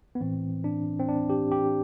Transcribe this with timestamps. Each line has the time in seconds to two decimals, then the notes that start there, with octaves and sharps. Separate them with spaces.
0.15 B3
0.21 A2 E3 C4
0.64 D4
0.99 C4
1.08 D4
1.30 G4
1.52 G4